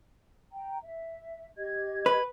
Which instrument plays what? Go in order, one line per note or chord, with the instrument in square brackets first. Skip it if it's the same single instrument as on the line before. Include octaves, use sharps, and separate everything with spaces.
[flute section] G5 A#5
E5
G4 D#5 G#6
[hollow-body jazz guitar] B4